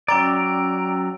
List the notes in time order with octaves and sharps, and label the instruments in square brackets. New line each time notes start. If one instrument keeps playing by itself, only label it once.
[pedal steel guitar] F#3 D5 [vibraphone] C#4 G5 E6 [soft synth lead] A#5